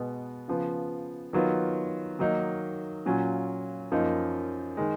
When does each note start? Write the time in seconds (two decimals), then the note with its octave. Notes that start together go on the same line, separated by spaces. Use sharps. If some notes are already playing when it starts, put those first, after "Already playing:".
Already playing: B2 G#3 B3
0.48 C#3 F3 B3
1.33 D#3 F#3 B3 F4
2.19 D#3 F#3 A#3 D#4
3.06 A#2 F#3 C#4 F4
3.92 F#2 F3 A#3 D#4
4.77 D#3 G#3